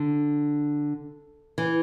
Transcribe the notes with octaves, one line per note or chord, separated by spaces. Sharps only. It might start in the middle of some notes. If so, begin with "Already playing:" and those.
Already playing: D3
E3